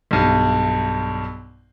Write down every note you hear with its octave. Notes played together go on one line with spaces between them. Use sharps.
B1 G2